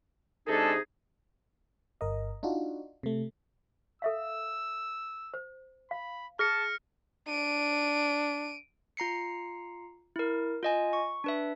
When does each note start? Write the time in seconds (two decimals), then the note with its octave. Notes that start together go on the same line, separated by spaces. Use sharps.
0.48 C3 G#3 D4 D#4 G#4 A4
2.01 G1 A#4 D#5
2.43 D4 D#4 F4 F#4
3.03 C3 A3
4.02 A4 E5 F5 E6
5.34 C5
5.91 F5 B5
6.39 G#4 A5 F6 A#6 C#7
7.28 D4 D7 D#7
8.97 F4 A#5 C7 C#7
10.16 E4 A#4
10.63 F4 D#5 G#5
10.93 C#6
11.24 D4 B4 E5